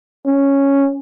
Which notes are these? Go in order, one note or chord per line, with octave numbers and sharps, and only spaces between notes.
C#4